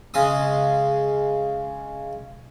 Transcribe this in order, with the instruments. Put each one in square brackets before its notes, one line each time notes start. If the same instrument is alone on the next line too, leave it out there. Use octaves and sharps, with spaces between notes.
[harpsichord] C#3 G#3 C6 D#6